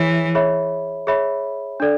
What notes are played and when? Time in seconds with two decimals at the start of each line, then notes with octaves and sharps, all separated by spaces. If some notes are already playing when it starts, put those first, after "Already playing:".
Already playing: E3 G#4 C#5 E5
0.35 G#4 C#5 E5 B5
1.07 G#4 C#5 E5 B5
1.80 D4 A4 D5